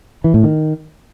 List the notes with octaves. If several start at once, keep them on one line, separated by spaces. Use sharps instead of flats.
E3
A2
D#3